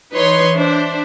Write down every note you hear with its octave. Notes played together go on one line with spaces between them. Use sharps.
E3 D#4 B4 C#5 C6
D4 C5 E5